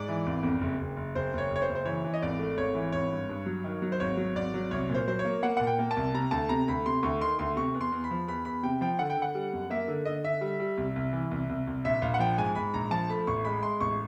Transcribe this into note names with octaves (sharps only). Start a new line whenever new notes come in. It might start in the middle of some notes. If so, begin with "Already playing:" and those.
Already playing: G#2 D5
E3
G#1
F2
F#1
F#1
F#1
F#1 C5
F#1 C#5
F#1
C#5
C5
F#1
C5
E3 C#5
E3
D#5
G#1 D5
A3
G#1 C#5
E3
G#1 C#5
G2
G2
F#3
D#3
F#3
C5
G#1 C#5
F#3
G#1 D5
F#3
C2 C#5
A#2
C5
F#3 C5
C#5
A#3
A#3 F#5
A#2 F#5
G5
A#3
A5
C2
C3 A#5
D2 A5
C3 A#5
D2 B5
C3 C6
D2 C#6
D#3 C6
D2 C6
C3 C#6
E2
C6
E2
B5
F3
E2 B5
E2 B5
C3 G5
F3 G5
D3 F#5
G5
D3
F#5
G3
F#2
A#3 E5
D3
D3 D#5
D3 E5
G3
G3
C2
C2
E3
C2
C2
C2
A#1 E5
A#1 F5
F#5
F3 G5
G#2 G#5
G#2 B5
A#1 A#5
F3 A5
A3 B5
A1 C#6
G#3 B5
G#3 C6
A1 C#6